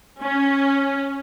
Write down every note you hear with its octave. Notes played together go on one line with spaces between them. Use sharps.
C#4